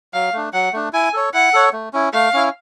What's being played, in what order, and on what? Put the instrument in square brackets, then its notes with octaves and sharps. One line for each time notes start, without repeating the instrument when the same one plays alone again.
[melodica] F#3 [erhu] F5
[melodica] A3 D4
[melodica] F#3 [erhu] F#5
[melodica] A3 D4
[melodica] E4 [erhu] G#5
[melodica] A4 C#5
[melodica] E4 [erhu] F#5
[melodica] A4 C#5
A3
C#4 E4
[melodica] A3 [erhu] F5
[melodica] C#4 E4